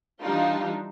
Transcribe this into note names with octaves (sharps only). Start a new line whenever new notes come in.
E3 G3 D4 D#4 F4